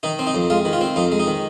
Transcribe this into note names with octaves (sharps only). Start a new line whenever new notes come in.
D#3 D#4
C4
D#4
F2
G#3 F4
D#3
F4
C4
F2 D#4
G#3
D#4
D#3